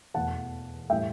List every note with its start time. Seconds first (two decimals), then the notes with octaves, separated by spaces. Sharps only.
0.14 E2 B2 A3 F#5 A5
0.90 A2 G3 E5 G5